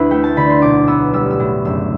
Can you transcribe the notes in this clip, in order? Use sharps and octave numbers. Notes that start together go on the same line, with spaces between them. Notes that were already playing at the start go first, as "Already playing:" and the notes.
Already playing: D2 E4 B4 E5
A3 G5
A5
D3 B5
C6
B1 D6
B3 E6
G3 E6
E6
A2
F#1 E6